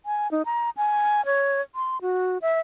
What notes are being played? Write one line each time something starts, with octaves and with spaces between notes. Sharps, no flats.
G#5
D#4
A#5
G#5
C#5
C6
F#4
E5